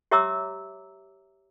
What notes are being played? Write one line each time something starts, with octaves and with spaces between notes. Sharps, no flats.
G4 C#5 E5 A#5 D6 E6